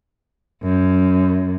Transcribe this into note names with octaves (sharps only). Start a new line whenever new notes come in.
F#2